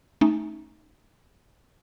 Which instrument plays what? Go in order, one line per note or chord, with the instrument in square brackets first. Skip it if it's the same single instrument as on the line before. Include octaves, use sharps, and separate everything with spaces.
[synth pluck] A3 C#4 D#4